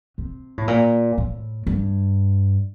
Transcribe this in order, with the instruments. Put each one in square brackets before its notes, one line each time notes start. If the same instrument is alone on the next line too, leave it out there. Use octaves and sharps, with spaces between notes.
[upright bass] C3
A2
A#2
A2
G2